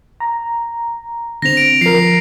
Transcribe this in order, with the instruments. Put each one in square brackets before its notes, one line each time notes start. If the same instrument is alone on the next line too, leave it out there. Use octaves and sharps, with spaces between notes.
[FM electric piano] A#5
[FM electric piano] D3 C4 [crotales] A#6 F7
[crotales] D7
[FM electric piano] F3 A#4 [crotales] C7